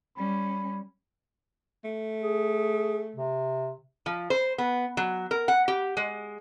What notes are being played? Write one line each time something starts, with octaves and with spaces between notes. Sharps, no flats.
G3 C#4 B5
A3
G#4
C3
F3
C5
B3
F#3
A#4
F#5
G4
G#3